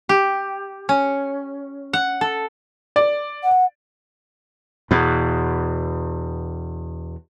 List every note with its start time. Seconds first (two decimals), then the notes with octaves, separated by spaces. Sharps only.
0.09 G4
0.89 C#4
1.93 F#5
2.21 A4
2.96 D5
3.43 F#5
4.91 E2 B2